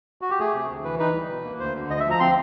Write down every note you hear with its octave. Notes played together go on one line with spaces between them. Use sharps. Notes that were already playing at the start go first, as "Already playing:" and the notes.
F#4
G4
A3 G#4
C3
D2
E3 B4
D#4 B4
G3
B2
A#3
D2 C5
D3
D2 D#5
E5
F3
A#5
C4 C6